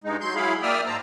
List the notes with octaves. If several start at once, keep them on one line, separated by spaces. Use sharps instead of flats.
G2 G#3 D#4
F#3 C6 G6
F#3 E4 G#4 F5 B5
A#3 D5 E5 G5 D#6 F6
G#2 C5 A5 A#5